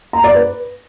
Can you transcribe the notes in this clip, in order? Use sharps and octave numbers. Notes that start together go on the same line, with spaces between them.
A#5
D5
B4